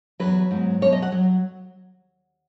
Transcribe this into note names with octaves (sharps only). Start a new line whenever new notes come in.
E2 B2 F#3 B4
G#2 F#3 B3
B2 F#3 B3 C#5
D#5
F#5
F#3